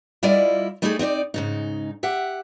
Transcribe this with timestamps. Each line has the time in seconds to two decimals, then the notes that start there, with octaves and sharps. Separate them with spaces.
0.23 G3 E4 F4 A#4 D5 D#5
0.82 G3 A3 D#4 E4 G4 G#4
0.99 C4 D#4 E4 D5
1.34 G#2 C#3 D#4
2.03 G4 E5 F#5